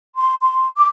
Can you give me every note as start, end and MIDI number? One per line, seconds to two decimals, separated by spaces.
0.18 0.34 84
0.42 0.65 84
0.77 0.87 86